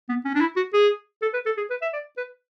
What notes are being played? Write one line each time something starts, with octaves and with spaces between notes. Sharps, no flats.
B3
C#4
D4
E4
F#4
G#4
A4
B4
A4
G#4
B4
E5
D5
B4